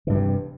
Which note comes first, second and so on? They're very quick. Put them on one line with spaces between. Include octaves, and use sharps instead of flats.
D#3 G2 E3 C3